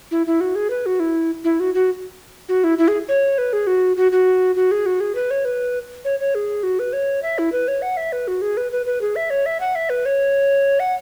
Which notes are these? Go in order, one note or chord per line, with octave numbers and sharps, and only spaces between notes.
E4
E4
F#4
G#4
B4
F#4
E4
E4
F#4
F#4
F#4
E4
E4
G#4
C#5
B4
G#4
F#4
F#4
F#4
F#4
G#4
F#4
G#4
B4
C#5
B4
C#5
C#5
G#4
F#4
B4
C#5
E5
E4
B4
C#5
F#5
E5
B4
F#4
G#4
B4
B4
B4
G#4
E5
C#5
E5
F#5
E5
B4
C#5
F#5